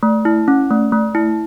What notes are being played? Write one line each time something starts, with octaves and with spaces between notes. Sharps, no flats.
A3
E4
C#4
A3
A3
E4